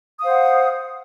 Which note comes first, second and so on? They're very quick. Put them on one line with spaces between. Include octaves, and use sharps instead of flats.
D#6 F5 C5 F#5